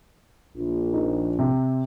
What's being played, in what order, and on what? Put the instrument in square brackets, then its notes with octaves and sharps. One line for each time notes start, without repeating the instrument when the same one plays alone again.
[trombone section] A#1
[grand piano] D#4
C3